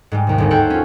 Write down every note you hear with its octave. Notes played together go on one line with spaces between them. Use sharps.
G#2 G3 G#3
D#2 C3
G1 C2 G#2
A4 A#4 C5 C#5 F#5 G5
C#4 F4